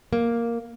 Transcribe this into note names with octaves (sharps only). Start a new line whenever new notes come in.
A#3